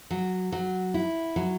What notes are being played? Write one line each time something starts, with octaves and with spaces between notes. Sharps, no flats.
F#3
F#3
E4
F#3